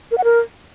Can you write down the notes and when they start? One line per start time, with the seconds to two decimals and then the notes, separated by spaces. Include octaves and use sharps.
0.11 A#4
0.18 F#5
0.24 A#4